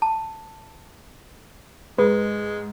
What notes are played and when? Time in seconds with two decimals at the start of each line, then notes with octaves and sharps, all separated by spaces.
0.02 A5
1.98 G#2 G#3 B4